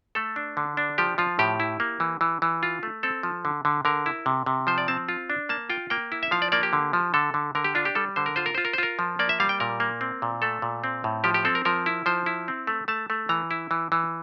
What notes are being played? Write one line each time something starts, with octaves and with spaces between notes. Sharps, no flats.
A3 A4
D4
D3
D4
F3 G4
F3 F4
A2 G4
E4
A#3
E3
E3
E3
F4
A3
C4 A4
F3
D3
D3
D3 A#4
E4
C3
C3
F3 C5
D5
C4 A5
F4
D4
A#3 A5
F4 G5
A#3 G5
E4
E5
F3 F5
D5
A#3 D5
G4
D3
F3
D3 A4
D3
D3 A#4
G4
D4 F4
G4
G3 A4
D3 C5
A#4
F4 C5
A#4
F4 C5
A#4
C5
F4 A#4
F3
A#3 D5
E5
G3 F5
G5
A#2 A#4
A#3
C4
A#2
A3 A4
A#2
C4
A2
F3 G4
G4
C4 A4
A#4
F3 A#4
E4
F3 C5
E4
C4
A3
A3 A5
A3
E3 A#5
E4
E3
E3